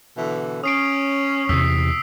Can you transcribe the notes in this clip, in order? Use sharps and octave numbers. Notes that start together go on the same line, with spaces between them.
B2 D3 E3
C#4 D#6 C7 D7
E2 C3 D#6 E6 B6